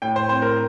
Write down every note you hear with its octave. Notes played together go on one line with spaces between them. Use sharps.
A2 G5
C5
C4 C5
A#4